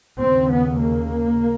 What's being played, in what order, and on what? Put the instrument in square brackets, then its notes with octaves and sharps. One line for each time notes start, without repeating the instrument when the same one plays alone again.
[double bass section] D#2 C#3 C4
B3
A#3